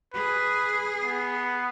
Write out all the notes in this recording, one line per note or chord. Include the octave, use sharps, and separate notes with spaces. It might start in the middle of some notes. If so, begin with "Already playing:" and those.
G#4 B4
B3